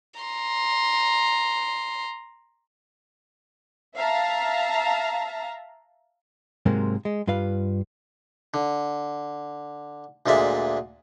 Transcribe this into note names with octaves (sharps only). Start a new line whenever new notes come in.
A#5 C6
E5 F5 A5 A#5
G#2 C3 F#3 G#3 A#3 C4
G#3
G2 F4 B4 F5
D3
D2 A#2 G#3 D5 E5